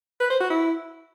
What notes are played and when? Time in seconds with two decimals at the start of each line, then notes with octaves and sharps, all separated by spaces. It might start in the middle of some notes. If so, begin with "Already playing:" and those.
0.20 B4
0.30 C5
0.40 F#4
0.50 E4